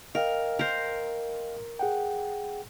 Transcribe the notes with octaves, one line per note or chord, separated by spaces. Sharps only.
A#4 D#5 F5 G5
A#4 C5
G#4 F#5 G5